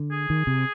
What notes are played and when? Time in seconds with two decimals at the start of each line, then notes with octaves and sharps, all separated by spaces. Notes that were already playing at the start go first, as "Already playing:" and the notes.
Already playing: D3
0.11 G#4
0.30 D#3
0.47 C3